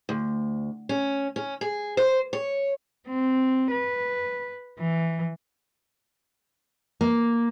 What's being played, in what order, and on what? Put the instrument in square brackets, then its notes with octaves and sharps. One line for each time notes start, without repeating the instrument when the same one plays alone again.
[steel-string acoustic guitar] D2
C#4
C#4
G#4
C5
C#5
[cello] C4
B4
E3
[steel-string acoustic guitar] A#3